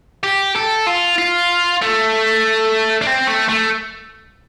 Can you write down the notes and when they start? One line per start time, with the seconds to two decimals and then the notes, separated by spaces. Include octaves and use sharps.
0.24 G4
0.56 A4
0.87 F4
1.18 F4
1.82 A3
3.02 D4
3.07 C4
3.27 A3
3.49 A3